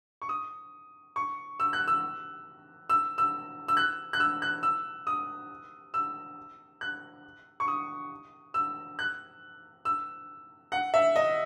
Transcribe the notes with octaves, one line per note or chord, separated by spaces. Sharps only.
C#6
D#6
C#6
E6
F#6
E6
E6
E6
E6
F#6
F#6
E6
F#6
E6
D#6
E6
F#6
C#6
D#6
E6
F#6
E6
F#5
E5
D#5